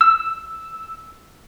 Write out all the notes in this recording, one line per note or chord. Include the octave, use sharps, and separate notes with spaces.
E6